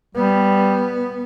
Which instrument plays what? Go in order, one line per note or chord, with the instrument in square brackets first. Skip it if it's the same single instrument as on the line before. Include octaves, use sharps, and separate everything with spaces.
[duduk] G3 [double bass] B3